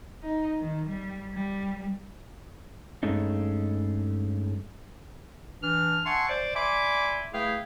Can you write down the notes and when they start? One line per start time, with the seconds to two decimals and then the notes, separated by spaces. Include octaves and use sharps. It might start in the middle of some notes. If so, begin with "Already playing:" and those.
0.22 D#4
0.59 D#3
0.88 G3
1.33 G3
3.03 G2 G#3 A3 C#4 D#4
5.62 E3 D4 F6
6.05 E5 F#5 G#5 A5 C6 C#6
6.28 C5 D5
6.54 D5 E5 G#5 B5 C6 D6
7.32 A3 E4 G#4 B4 F5 G5